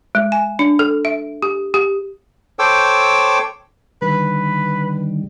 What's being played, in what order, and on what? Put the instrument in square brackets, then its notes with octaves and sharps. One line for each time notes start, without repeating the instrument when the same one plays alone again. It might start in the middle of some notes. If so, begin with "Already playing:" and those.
[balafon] G#3
G#5
D4
A4
E5
G4
G4
[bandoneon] A4 C5 C#5 G5 D6 E6
[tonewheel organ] D3 D#3 G3 [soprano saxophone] B4